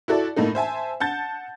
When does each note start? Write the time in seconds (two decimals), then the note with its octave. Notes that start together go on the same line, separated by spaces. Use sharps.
0.08 E4 F#4 A4 D5
0.36 A2 A#3 D#4 A4
0.55 C5 E5 G#5 A5
1.00 F#5 A5 G6 A6